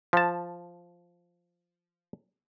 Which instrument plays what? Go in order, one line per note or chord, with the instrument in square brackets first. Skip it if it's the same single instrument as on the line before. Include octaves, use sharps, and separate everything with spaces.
[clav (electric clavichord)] F3 A5